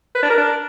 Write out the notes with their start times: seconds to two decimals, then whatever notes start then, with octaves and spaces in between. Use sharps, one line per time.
0.15 B4
0.23 D4
0.30 A#4
0.38 D4